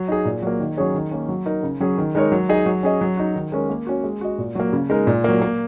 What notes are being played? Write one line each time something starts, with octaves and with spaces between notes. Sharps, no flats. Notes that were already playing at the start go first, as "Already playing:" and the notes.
Already playing: F#3
D#4 G#4
A#2
F#3 A#3
D#3
F#3 C#4 G#4 C#5
D#3
A#3 C#4
F#3
D#4 A#4
C#3
F#3 C#4 G#4
D#3
G#3 D#4 A#4 C#5
F#3
D#4 G#4 D#5
F#3
C#4 G#4 D#5
F#3
D#4 F#4
D#3
G#3 C#4 A#4
A#3
C#4 F#4
G#3
F#4 D#5
A#2
F#3 A#3
C#3
G#3 D#4 A#4
A#2
F#3 A#3
A#3